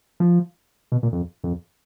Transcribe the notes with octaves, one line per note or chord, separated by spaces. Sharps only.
F3
B2
A#2
F2
F2